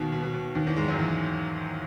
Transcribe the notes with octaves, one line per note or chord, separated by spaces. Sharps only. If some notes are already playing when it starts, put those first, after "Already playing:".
Already playing: D#2 B2 D#3
B2
B2
B2
D#2 D#3
E2 E3
G#2 G#3
F#2 F#3
E2 E3